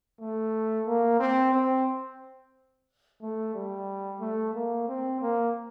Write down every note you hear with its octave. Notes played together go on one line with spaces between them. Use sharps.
A3
A#3
C4
C4
A3
G3
A3
A#3
C4
A#3